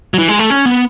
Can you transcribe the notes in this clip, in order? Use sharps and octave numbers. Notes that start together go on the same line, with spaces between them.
F#3
E3
G#3
A3
C#4
B3